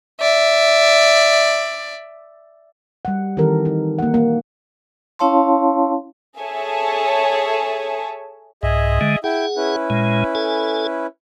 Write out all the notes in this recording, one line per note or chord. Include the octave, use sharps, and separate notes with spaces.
D5 E5
G3 F#5
D#3 E3 C4 G4 A4 A#4
D#4
A#3 F#5
A#3
C#4 E4 C#5 F5 A5 C6
G#4 A4 C#5 E5 G#5 A5
C2 G#2 G#4 D#5 E5
D3 G#3
E4 G#4 F#5 G5
C#4 E4 B4
A#2 G#3
A4 G#5